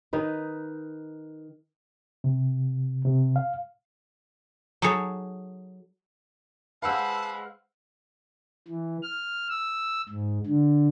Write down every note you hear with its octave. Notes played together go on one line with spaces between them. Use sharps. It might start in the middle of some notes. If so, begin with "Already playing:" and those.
D#3 D#4 B4
C3
C3
F5
F#3 D#4 G#4 A4 C#5
G#3 B4 C5 F5 F#5 A5 B5 E6
E3
F6
E6
G#2
D3